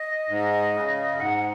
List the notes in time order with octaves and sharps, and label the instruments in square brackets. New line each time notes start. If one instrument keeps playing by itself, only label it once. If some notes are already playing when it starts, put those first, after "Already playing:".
Already playing: [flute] D#5
[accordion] G#2
C#3
F#2
[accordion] G#2 [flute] F#5